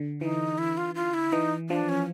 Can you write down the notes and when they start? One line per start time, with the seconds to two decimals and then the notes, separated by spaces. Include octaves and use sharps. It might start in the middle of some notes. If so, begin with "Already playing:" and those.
Already playing: D3
0.21 E3 D#4
0.58 E4
0.78 F4
0.95 F4
1.14 E4
1.33 E3 D#4
1.70 F3 D4
1.89 C#4